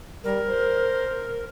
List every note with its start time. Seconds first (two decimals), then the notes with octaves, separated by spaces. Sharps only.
0.24 G3 A#4
0.48 C5